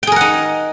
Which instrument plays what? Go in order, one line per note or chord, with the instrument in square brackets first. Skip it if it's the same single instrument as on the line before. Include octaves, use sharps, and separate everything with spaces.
[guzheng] G5
G#4
A#4
F#5
D#4